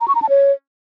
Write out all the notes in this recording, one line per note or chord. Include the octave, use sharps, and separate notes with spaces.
A#5
C#6
A#5
A5
C#5